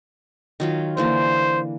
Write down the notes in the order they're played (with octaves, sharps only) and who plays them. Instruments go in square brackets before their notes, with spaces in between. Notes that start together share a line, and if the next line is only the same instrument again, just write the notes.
[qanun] D#3 F#3 F4
[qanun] D3 E3 A#3 [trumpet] C5